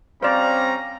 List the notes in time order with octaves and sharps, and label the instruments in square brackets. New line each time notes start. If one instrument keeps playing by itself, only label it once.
[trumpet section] G3 C#4 A#5 [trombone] C4 [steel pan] C5 D5 [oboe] F5